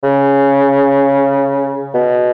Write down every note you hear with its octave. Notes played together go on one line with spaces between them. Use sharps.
C#3
B2